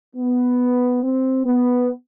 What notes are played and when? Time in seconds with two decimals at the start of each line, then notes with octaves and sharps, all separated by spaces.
0.16 B3
1.02 C4
1.45 B3